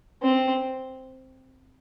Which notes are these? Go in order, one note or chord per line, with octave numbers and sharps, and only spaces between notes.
C4